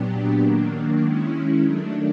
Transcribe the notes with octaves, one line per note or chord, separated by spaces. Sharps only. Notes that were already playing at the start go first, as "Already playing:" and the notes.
Already playing: A#2 F#3 B3 D4 G4
D#3 F#3 A#3 D4
D#3 G#3 C#4 E4
D#3 F#3 A3 D4